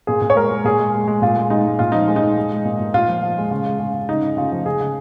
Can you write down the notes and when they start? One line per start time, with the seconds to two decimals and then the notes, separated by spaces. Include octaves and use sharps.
0.07 A#2 G#4
0.22 A#2
0.30 C#5
0.36 G#3 A#4
0.51 G#3
0.64 A#2 G#4
0.79 G#3
0.94 G#3
1.07 G#3
1.22 A#2 F4
1.37 G#3
1.50 G#3 D#4
1.65 G#3
1.79 A#2 F4
1.92 F3 D#4
2.08 G#3
2.16 D#4
2.23 G#3
2.37 G#3
2.52 G#3
2.65 A#2
2.80 A#2
2.94 A#2 F4
3.08 F3
3.22 F3
3.38 G#3
3.51 C#3
3.66 G#3
3.79 C#3
3.94 C#3
4.09 C#3 D#4
4.23 C#3
4.37 C#3 F4
4.52 F3
4.66 C#3 G#4
4.80 C#3